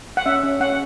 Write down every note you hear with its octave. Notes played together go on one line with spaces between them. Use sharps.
F#5
C#4 E5
C#4
C#4 F#5